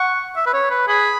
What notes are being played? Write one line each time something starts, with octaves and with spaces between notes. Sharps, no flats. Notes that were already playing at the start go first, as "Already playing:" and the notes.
Already playing: F#5 C#6
E5
B4
C#5
B4
G#4 B5